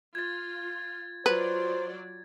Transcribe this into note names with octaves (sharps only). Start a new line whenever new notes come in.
F4 G#6 A6
F#3 F4 B4 C5 D5